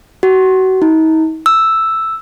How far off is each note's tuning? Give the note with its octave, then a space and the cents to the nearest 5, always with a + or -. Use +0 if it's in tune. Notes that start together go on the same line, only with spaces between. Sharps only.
F#4 +30
D#4 +40
E6 +0